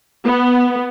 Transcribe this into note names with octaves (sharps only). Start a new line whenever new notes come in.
B3